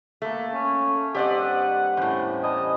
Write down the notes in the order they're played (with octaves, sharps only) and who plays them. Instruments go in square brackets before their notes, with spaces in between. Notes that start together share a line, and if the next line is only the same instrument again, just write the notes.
[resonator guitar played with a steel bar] A3 [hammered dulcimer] A#3 A4
[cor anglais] C#4
[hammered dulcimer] G2 C4 [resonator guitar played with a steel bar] G4 D5 D#5 [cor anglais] F#5
[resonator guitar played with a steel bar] E2 A2 [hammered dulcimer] C#4 G4 C5
[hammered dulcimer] G3 G#5 A5 [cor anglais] D#5